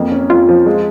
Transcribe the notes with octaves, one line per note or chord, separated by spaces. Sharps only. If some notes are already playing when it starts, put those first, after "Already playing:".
Already playing: F2 A#3
C#4
F2 F4
F3
G#3